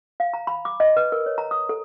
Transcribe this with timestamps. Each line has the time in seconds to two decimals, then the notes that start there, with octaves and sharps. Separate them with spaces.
0.20 F5
0.34 A#5
0.47 B5
0.65 D6
0.80 D#5
0.97 B4
1.12 A#4
1.26 C#5
1.38 A#5
1.51 D#6
1.69 A4